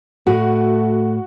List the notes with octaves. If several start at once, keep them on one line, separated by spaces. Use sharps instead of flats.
A2 A3 F#4